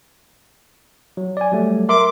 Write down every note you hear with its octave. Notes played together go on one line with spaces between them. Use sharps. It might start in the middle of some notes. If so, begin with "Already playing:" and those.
F#3
D5 G#5
F#3 G3 A3
A#4 E5 C6 D6